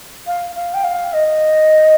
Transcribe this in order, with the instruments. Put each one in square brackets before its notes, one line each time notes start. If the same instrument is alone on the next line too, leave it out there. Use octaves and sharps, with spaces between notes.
[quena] F5
F5
G5
F5
D#5